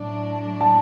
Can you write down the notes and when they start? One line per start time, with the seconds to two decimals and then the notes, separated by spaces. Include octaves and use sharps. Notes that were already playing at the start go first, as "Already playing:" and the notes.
Already playing: A2 F#3 D4
0.61 A5